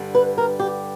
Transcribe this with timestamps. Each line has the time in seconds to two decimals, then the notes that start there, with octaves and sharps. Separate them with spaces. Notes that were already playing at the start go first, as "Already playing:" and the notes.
Already playing: G2 D3 G3
0.15 B4
0.38 A#4
0.60 G4